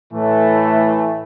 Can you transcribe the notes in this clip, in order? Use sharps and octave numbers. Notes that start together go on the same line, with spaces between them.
A2 E3 A3